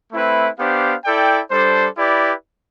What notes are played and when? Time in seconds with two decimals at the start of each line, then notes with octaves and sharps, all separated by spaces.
0.11 A3 C4 E4 B4
0.57 B3 D4 G4 C5 F5
1.04 E4 A4 D5 G5
1.50 G3 D4 A4 C5
1.96 E4 G4 B4 D5